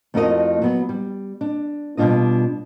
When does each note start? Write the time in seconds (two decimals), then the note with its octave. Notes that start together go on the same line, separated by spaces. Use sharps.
0.14 F2 A3 E4 F#4 A#4 D#5
0.62 F#3 B3
0.89 G3
1.41 D4
1.97 B2 G3 D4 F4 D#5